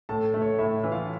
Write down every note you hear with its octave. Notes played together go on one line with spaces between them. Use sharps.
A2 A4 A5
A3
C#5
A2 E4 E5
E3
F4 F5